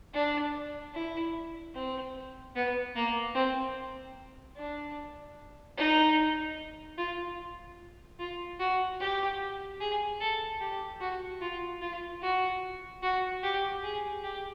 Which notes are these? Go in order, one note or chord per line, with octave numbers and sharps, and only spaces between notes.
D4
E4
C4
B3
A#3
C4
D4
D#4
F4
F4
F#4
G4
G#4
A4
G4
F#4
F4
F4
F#4
F#4
G4
G#4
G4